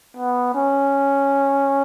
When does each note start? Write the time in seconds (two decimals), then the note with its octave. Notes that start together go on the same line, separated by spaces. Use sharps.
0.17 B3
0.55 C#4